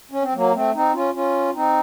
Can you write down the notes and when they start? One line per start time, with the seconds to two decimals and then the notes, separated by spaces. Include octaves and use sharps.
0.11 C#4
0.22 C4
0.34 F#3 A#3
0.54 A3 C4
0.74 C4 D#4
0.94 C#4 F4
1.14 C#4 F4
1.54 C4 D#4